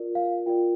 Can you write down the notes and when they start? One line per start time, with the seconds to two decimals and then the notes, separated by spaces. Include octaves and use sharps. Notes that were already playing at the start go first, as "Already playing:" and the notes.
Already playing: F4 A#4 D5
0.15 F5
0.46 F4 A#4 D5 G5